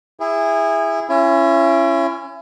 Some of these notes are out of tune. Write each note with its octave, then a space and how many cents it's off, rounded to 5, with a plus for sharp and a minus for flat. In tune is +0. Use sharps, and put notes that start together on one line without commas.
E4 +0 G#4 -25
C#4 -10 E4 +35